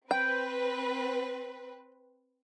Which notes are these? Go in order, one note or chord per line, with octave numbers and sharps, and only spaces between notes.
C4 B4 G5